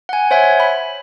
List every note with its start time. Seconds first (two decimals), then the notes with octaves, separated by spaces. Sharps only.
0.09 F#5 G#5
0.31 C5 C#5 E5 F#5 G#5
0.60 B5